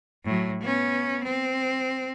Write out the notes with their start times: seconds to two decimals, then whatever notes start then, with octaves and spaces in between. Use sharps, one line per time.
0.25 A2 F#3
0.61 B3 C#4
1.24 C4